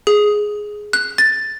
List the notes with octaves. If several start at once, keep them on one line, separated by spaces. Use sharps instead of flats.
G#4
F#6
A6